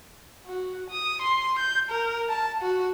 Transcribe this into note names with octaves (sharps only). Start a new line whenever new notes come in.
F#4
D#6
C6
G6
A#4
A5
F#4